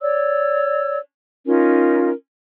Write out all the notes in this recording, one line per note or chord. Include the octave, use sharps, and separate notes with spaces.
C#5 D5 E6
C#4 D#4 F4 A#4